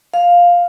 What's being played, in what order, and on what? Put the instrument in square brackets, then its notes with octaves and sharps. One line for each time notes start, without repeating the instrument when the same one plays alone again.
[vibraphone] F5